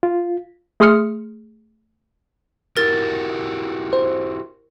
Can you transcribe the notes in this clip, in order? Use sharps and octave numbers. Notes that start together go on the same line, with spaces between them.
F4
A3 G#4 C6 D#6 F6 C#7
E4 F#4 G4 A#4 A6
C5